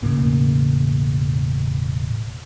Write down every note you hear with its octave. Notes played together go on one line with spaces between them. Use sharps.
E1 A2 C#3 A#3